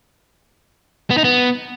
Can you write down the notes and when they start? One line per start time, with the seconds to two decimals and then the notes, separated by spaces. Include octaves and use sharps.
1.11 B3
1.18 D#4
1.24 B3